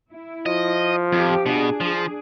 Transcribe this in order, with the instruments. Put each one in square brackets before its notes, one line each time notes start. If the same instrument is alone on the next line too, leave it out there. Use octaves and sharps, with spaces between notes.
[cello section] E4
[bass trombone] F3 [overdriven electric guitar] D#5
[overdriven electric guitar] F2 [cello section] F4 G4
[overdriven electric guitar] B2 [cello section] D4 G#4
[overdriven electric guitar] F3